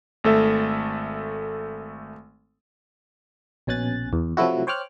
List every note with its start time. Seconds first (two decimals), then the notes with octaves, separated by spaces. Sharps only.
0.24 G#1 A3 A4 E5
3.67 A#1 B2 C#4 G#5 F#6 A6
4.13 E2
4.37 C3 F3 F#3 A3 E4 F#4
4.67 C5 C#5 G5 D6 F6 F#6